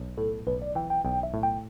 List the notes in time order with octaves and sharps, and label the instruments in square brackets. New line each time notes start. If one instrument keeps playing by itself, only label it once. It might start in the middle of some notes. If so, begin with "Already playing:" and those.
Already playing: [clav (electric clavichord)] B1
[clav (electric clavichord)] A2 [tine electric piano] A4
[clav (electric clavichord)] B1 [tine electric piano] B4
[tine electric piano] D5
[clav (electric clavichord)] E3 [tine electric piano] G5
[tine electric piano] G5
[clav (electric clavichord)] B1 [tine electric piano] G5
[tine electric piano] E5
[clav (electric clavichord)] A2
[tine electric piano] G5